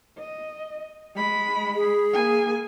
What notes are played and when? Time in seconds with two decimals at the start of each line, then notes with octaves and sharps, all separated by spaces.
0.18 D#5
1.15 G#3 B5
1.75 G#4
2.14 A#3 G#5